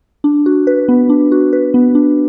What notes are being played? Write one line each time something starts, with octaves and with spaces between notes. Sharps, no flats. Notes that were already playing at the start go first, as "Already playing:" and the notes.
D4
F#4
B4
B3
D4
F#4
B4
B3
D4